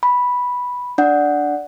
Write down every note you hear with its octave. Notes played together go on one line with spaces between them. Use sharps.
B5
D4 D5 F#5